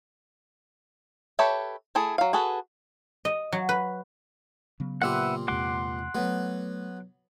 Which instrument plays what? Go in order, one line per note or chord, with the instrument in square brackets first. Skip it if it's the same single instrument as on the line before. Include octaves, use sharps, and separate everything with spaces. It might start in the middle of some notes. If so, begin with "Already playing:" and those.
[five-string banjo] G4 A4 B4 C#5 E5
A3 E4 G#4 A4
F#3 F5
F#4 G#4 A4 B4
[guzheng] D#5
F#3
B4
[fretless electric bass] C#3 F#3 B3
[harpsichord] A#2 C4 G4 [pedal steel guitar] B4 E5 F#5
[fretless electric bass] E2 C3 G#3 [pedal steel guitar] F#5 C6 D6
[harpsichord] F#3 B3 [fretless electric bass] A3